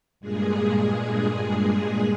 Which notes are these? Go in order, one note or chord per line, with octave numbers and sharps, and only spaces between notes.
G2 A#2 G#3 G#4